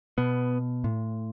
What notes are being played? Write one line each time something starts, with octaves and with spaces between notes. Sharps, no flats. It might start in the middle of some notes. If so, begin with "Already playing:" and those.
B2 B3
A2